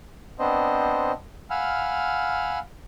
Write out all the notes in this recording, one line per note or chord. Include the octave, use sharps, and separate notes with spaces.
B3 C4 D4 C5 D#5
F5 F#5 G#5 B5 E6 F6